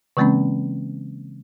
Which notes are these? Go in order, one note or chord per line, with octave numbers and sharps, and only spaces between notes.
C#3 E3 G#3 A#3 C4 C#4